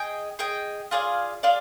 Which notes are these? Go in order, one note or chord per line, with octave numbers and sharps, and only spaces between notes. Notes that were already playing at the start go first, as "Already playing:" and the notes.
Already playing: G#4 D#5 G5
G#4 D#5 G5
F4 G#4 D5 F5
F4 G#4 D5 F5